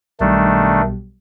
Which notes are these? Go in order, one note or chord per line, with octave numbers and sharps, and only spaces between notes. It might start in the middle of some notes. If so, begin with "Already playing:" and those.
B1 D#3 G3 A3 D4